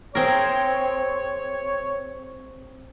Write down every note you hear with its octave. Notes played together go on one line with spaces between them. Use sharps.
C4 G#4 A#4 C#5